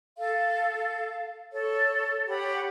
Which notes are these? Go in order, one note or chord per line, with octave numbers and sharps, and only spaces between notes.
A4 F5
A4 C#5
G4 C#5 F#5 B5